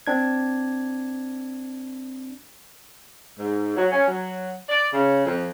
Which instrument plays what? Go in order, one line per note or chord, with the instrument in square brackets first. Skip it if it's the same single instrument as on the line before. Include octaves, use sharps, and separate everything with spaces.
[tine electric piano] C4 D4 G#6
[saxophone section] G#2
F#3
C#4
F#3
D5
C#3
F2